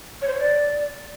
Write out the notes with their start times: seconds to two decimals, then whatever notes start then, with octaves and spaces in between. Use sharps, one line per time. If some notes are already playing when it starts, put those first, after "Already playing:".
0.22 C#5
0.28 C5
0.33 C#5
0.39 D5